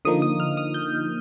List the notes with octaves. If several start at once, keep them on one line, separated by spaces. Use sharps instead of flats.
D3 F3 A#3 D#4 D#6
D#6
F6
D#6
G6